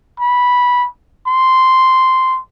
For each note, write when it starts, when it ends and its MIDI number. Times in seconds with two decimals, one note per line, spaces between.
0.20 0.88 83
1.28 2.39 84